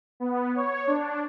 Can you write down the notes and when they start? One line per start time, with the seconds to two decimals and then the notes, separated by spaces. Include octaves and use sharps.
0.20 B3
0.55 C#5
0.87 D4